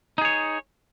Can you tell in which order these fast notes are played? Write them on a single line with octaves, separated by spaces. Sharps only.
D#4 G#4 C#5